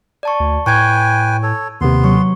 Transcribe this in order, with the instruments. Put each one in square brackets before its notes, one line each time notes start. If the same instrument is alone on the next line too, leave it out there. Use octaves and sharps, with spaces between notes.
[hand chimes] D5 A5 C#6
[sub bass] D2
[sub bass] A2 [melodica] B4 G5 G#5 [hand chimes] C#6 G#6
[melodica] A4 C#5
[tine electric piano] D#2 C3 [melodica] B3 C6
[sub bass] F#3 [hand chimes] C#6